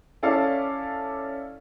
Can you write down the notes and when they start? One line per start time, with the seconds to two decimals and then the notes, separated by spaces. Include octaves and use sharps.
0.23 C#4 E4 A4 D5 F5 A5